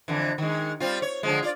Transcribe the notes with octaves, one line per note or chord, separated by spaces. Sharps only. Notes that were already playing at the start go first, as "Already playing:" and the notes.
F2 D3 E3
D#3 G#3
G3 C4 F4
C#5
D3 F3 G#3
F4 D5